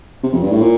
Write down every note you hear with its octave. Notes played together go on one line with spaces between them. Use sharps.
C3
F2
G2
A2
A#2